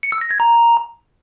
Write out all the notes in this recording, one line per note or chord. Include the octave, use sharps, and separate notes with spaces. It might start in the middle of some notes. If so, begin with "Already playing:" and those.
C#7
E6
A#6
G#6
A#5